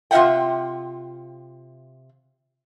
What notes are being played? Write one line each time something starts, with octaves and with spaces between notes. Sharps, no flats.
C3 F4 D5 E5 F#5 G5